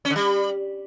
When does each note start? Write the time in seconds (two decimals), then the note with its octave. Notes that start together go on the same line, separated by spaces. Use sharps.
0.05 C#4
0.10 D3
0.16 G3